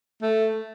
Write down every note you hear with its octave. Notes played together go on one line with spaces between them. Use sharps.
A3